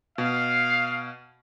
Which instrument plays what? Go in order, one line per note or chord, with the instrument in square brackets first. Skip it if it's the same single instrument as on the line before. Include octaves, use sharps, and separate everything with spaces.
[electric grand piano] B2 [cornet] F5